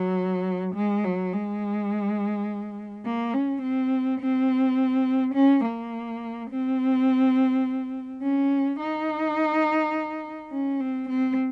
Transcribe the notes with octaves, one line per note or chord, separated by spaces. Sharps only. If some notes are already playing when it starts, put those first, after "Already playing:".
Already playing: F#3
G#3
F#3
G#3
A#3
C#4
C4
C4
C#4
A#3
C4
C#4
D#4
C#4
C4
C4